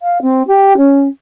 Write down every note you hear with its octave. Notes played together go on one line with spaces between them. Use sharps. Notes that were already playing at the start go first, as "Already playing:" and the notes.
F5
C4
G4
C#4